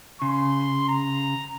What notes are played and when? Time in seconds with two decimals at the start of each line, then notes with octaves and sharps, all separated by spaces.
0.22 C#3 C6
0.88 A#5